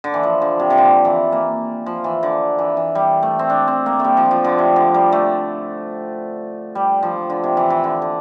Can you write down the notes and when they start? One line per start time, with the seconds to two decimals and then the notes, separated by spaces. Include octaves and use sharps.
0.04 D3
0.14 E3
0.23 F3
0.42 D3
0.59 C3
0.70 C3
0.78 D3
1.05 E3
1.32 A#3
1.86 F3
2.04 E3
2.23 D3
2.59 E3
2.77 E3
2.95 G3
3.23 A3
3.39 C4
3.50 D4
3.68 C4
3.86 A#3
4.00 G3 A3
4.17 F3
4.31 F3
4.44 D3
4.58 C3
4.76 D3
4.94 G3
5.12 A3
6.75 G3
7.03 F3
7.30 D3
7.43 C3
7.57 E3
7.70 E3
7.84 D3
8.02 D3